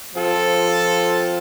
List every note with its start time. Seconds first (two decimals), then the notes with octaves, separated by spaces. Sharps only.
0.15 F3 C4 F4 A4